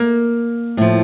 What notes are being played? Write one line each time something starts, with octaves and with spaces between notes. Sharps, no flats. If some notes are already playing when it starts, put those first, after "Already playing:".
Already playing: A#3
A2 F3